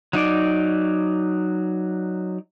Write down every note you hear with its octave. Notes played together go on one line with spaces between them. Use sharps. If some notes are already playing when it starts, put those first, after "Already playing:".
F#3 D#4 D5